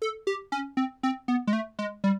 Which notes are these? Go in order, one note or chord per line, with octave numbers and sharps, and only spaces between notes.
A4
G4
C#4
C4
C4
B3
G#3
A3
G#3
G3